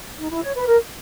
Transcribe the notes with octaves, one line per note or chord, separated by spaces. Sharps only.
D#4
E4
C#5
B4
A#4